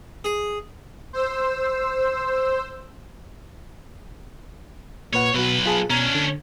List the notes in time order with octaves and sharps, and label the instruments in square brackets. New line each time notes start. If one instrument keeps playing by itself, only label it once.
[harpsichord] G#4
[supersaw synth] C5 E6
[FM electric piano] A#2 B4 F#5 [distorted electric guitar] C#5
[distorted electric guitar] B1 B4 [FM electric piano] B2 F#4
[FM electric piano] F4 G#4 A5
[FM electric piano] B2 A#5 G#6 [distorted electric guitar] C#4 D4
[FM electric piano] D3